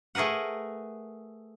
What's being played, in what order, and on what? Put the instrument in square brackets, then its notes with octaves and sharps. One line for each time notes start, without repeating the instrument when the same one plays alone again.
[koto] A3 G#4 A#4 B4 F#5